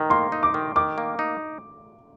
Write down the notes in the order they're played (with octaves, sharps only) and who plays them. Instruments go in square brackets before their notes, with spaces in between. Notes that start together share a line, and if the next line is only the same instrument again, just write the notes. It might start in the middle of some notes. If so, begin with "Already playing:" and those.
Already playing: [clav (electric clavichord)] D#3 [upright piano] A#5
[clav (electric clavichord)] A#3 [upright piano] C6
[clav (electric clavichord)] D#4
[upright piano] D6
[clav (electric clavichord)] D#3
[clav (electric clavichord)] D#3 [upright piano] D6
[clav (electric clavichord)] A#3
D#4